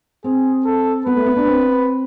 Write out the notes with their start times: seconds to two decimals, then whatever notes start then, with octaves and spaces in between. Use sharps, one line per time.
0.24 C4 G#4
0.65 A4
1.06 B3 B4
1.16 A3
1.26 B3
1.37 D4
1.47 C4